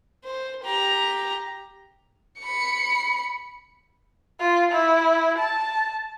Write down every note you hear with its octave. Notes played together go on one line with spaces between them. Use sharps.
C5
G4 A#5
B5 C#7
F4
E4
A5